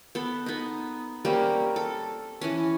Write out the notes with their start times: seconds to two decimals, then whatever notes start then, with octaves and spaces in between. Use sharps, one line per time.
0.15 B3 A4
0.46 B3 D#4
1.25 G3 A#3 C4 C#4
1.76 A4
2.41 E3 C#4